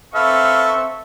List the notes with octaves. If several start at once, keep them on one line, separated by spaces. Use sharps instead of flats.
C4 A4 B4 E5 F5 C#6